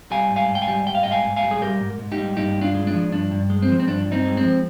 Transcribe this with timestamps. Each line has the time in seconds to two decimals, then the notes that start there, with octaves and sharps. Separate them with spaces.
0.11 G3 F5 G#5
0.30 G#2
0.36 F5 G#5
0.49 G#2
0.55 G5
0.62 F5 G#5
0.68 G3
0.86 G3 G5
0.95 F5
1.03 G#2 D#5 G5
1.11 F5 G#5
1.24 G#2
1.36 F5 G#5
1.43 G3
1.51 G#4
1.62 G3 G4 A#4
1.81 G#2
1.99 G#2
2.12 D#4 G4
2.18 G3
2.37 G2 D#4 G4
2.56 G2
2.61 D4 F4
2.75 G#3
2.87 D4
2.94 F3
3.12 G2 D4
3.31 G2
3.50 G#3
3.62 C4
3.69 F3
3.80 C4
3.87 G2 D4
4.06 G2
4.12 C4 D#4
4.25 G#3
4.37 C4
4.43 F3